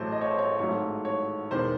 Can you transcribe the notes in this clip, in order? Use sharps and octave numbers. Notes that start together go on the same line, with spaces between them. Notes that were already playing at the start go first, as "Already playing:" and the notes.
Already playing: A1 A2 F#3 A3 C5
D#5
C#5
C5
C#5
G#1 G#2 F#3 A3 C#5
C#5
E1 E2 D#3 C5